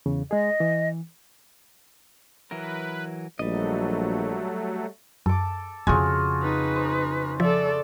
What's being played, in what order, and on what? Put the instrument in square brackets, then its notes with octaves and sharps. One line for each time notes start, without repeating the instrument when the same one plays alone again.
[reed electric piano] E2 C#3
[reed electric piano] G#3 G#4 [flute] D#5
[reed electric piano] E3
[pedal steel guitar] E3 F#3 A#4 [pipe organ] B4
[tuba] A#1 [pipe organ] F#3 A3 [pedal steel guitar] G3 D#5
[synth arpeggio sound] F#2 [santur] A4 D6
[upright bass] F2 C#3 [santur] F4 F#4 G#4 [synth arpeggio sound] G#5
[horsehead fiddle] D#4 B4
[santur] C5
[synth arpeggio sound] F3 [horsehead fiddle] A4 D5 [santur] E5